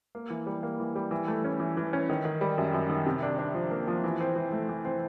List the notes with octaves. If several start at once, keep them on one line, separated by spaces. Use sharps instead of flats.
A#3
E3
G3
A#3
E3
G3
E3
A3
C#4
E3
E3
C#4
D#3
D#3
G3
F#2
F#2
D#3
C3
D4
D4
F3
A#3
F3
E3
C4
E3
A3
E3
C4